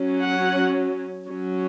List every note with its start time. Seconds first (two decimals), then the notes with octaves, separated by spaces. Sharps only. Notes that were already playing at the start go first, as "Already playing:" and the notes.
Already playing: F#3 C#4
0.22 F#5
1.27 F#3 C#4